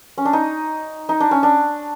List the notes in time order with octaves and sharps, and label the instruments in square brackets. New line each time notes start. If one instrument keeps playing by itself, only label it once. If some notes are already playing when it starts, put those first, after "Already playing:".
[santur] C#4
D4
D#4
D#4
D4
C#4
D4